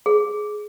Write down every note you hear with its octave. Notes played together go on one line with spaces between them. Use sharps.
G#4